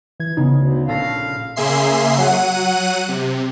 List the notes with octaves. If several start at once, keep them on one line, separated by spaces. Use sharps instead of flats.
E3 G#6
C#3 B3 D#4
D2
A#1 A4 F5 A#6
C#3 A#3 G#4 E5 C6 C7
F#3 F#5 F#6 D#7
C3